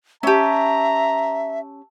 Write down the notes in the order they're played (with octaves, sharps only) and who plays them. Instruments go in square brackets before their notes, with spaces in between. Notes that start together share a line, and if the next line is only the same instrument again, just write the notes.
[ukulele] C#4 G4 [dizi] E5 [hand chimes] A5 E6 [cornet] A#5